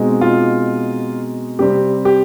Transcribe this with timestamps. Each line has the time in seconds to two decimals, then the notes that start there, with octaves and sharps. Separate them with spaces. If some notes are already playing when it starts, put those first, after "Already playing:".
Already playing: B2 G#3 C4 D#4
0.21 F4
1.59 C3 G3 C4 G4
2.05 G4